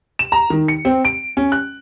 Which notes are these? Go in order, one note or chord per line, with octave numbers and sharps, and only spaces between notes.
E7
A#5
D#3
C#7
C4
D7
C#4
F#6